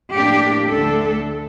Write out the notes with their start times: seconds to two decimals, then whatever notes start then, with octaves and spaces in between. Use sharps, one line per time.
0.13 A2 F3 A#3 D4 G4
0.69 D2 D3 A3 D4 A4